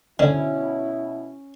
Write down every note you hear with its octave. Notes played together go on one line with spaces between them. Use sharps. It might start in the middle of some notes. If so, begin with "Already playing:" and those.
B2 D3 C#4 E4